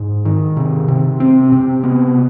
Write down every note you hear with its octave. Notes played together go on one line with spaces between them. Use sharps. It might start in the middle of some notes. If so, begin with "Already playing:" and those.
Already playing: G#2
D#3
C3
C3
C4
C3
B3